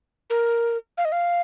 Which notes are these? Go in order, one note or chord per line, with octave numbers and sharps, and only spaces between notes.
A#4
F5
D#5
F5